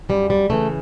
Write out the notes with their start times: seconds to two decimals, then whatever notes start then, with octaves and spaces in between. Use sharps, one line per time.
0.09 F#2 G3
0.30 G3
0.50 C#3 E3 A3